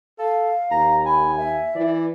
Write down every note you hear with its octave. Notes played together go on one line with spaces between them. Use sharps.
A4 F5
D#2 A#5
G#5 B5
E5
E3 D5